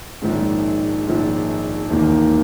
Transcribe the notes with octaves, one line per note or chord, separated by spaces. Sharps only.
A#1 G#2 D#3 G#3 C#4
A#1 G#2 D#3 G#3 C#4
E1 D#2 D#3 A#3